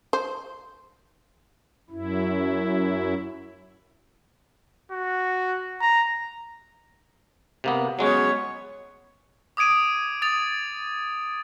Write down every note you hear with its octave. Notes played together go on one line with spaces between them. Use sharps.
C5
F#2 E4
F#4
A#5
C3 A#3 B3
F#3 G#3 B3 C#4 C#5
D6 D#6 G#6 D7 D#7
D#6 A6 F7